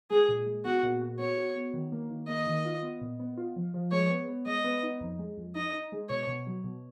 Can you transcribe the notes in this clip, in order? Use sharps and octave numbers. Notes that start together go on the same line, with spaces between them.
G#3 G#4
A#2
G#3
B3 F#4
A#2
F#4
B3 C#5
F#4
B3
D#3
A#3
D#3
A#3 D#5
D#3
F4
B3
A#2
B3
F4
F3
F3
G#3 C#5
B3
B3
G#3 D#5
B3
D#4
F2
G#3
F2
D#4 D#5
D#4
G#3
B2 C#5
B2
F#3
B2